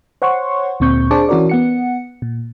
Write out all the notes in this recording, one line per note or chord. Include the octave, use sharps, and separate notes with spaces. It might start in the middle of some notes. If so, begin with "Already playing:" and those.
C5 C#5 F#5 C6 C#6
D2 A#2 C4 C#6 G6
D4 G#4 C5 A5 C#6 D6
E3 C#4 F#4 A#4 D5
B3 F#5 C#7
A#2